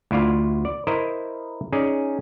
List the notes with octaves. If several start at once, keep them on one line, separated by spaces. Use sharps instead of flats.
D2 E4 F4 D5 F5
D5
E4 A#4 C5 D#5
C#4 D#4 G#4 D5